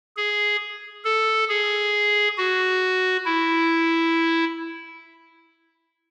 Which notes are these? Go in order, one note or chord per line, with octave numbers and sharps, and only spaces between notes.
G#4
A4
G#4
F#4
E4